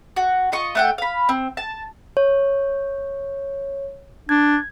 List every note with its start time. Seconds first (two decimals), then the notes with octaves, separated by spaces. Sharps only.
0.16 F#4
0.52 F4 D#5 C#6
0.75 A3 F#5 G5
0.98 F5 B5
1.29 C4
1.57 A5
2.17 C#5
4.29 D4 G#6